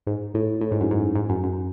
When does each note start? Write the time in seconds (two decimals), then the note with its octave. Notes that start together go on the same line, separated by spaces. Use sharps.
0.07 G#2
0.34 A2
0.61 A2
0.71 G#2
0.81 F#2
0.91 G#2
1.15 G#2
1.29 F#2
1.43 F#2